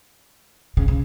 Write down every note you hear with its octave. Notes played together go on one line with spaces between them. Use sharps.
C#3
C#3